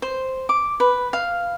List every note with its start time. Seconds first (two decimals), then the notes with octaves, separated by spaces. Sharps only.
0.02 C5
0.49 D6
0.80 B4
1.13 F5